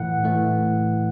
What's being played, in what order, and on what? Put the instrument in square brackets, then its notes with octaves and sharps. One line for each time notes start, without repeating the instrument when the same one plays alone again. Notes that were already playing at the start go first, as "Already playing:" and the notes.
Already playing: [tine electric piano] A2 E3 A3 F#5
A2 E3 A3